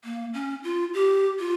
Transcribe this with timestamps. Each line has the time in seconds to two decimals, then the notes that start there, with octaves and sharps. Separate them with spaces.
0.04 A#3
0.34 C#4
0.64 F4
0.94 G4
1.39 F4